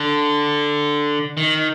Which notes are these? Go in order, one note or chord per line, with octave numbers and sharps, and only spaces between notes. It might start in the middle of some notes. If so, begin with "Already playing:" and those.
Already playing: D3
D#3